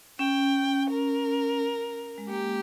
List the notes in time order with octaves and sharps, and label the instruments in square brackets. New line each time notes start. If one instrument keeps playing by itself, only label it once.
[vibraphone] C#4 [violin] G5
[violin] A#4
[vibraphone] G#3
[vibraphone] A#3 [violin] G4